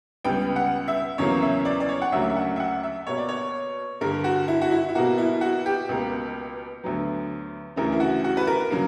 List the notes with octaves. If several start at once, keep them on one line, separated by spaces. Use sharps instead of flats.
C#2 C#3 G3 B3 G5
F#5
E5
E2 C#3 F#3 A#3 C#5
E5
D5
D5
C#5
F#5
D2 C#3 F#3 A#3 E5
E5
F#5
E5
F#5
E5
B2 A#3 C#5
D5
C#5
G2 D3 A#3 A#4
F#4
E4
F#4
E4
E4
B2 A#3 F#4
E4
F#4
G4
C#2 B2 A#3
D2 D3 F#3 B3
D2 C#3 E3 A#4
E4
F#4
F#4
B4
A#4
C#3 F#3 A#3